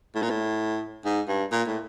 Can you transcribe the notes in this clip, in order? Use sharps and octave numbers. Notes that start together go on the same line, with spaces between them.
A2
A#2
A2
G#2
G2
A#2
A2